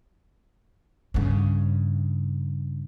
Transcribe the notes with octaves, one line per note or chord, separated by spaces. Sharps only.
G2 C#3